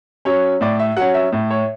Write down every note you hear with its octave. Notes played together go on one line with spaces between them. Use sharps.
F#3 C#4 C#5
A2 D5
E5
F#3 C#4 F#5
E5
A2
C#5